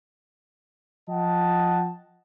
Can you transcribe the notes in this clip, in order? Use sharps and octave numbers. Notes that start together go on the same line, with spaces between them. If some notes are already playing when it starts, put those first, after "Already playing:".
F3 D#5 F#5 G5 A5